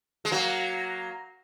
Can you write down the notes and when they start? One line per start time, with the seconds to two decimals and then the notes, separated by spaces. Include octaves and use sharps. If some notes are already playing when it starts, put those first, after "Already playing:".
0.25 G#3
0.31 F#3 A#3